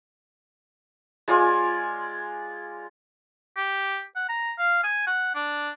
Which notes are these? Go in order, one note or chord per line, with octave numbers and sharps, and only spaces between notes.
G#3 F4 D5 G#5
G4
F#5
A#5
F5
G#5
F#5
D4